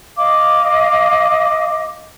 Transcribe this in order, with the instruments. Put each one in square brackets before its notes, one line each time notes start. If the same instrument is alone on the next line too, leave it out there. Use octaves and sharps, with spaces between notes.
[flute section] D#5 F5 D6